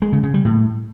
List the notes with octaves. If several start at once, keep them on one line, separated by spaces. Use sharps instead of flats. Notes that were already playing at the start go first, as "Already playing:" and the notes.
G#3
C#3
C#3
G3
A2